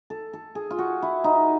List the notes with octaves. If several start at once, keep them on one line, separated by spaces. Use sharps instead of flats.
A4
A4
G#4
F4
F#4
E4
D#4